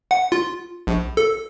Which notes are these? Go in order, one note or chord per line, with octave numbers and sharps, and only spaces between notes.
F#5
F4
A#1
A4